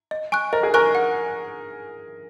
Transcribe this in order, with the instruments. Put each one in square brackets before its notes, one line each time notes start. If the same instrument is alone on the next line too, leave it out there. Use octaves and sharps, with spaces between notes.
[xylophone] D#5
G#5 C#6 F#6
[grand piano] A#4 [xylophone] D#5
[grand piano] G#4
[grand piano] A#4 [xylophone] G#5 C#6 F#6
[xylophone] F#5